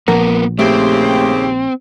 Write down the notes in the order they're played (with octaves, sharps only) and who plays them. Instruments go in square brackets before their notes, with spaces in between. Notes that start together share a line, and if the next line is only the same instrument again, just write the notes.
[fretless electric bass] A#1 [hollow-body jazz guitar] F3 A#4 F#5 [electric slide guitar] A#3 B3
[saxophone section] D#2 C#3 G4 [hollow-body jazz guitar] A3 [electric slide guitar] C4